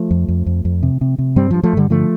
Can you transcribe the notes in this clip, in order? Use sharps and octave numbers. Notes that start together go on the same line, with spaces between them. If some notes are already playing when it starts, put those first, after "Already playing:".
Already playing: F3 A3
F2
F2
F2
F2
C3
C3
C3
G2 G3 C4
G2 F3
F3 A3
G2 D3 G3
D3 F3 A3